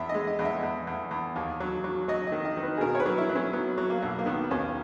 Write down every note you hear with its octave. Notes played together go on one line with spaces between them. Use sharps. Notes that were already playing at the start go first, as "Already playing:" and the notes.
Already playing: E2 E5
G#3 D#5
D#5
E2
E5
E2
E2
E2
D#2
F#3
F#3
F#3 D#5
D#5
D#3
D#5
D#3
B4
G#4
B2 A#4
C#5
B4
F#3
E4
F#3
C#4
F#3 B3
F#3
A#3
B1
A#3
D#3 B3
D#2 C#4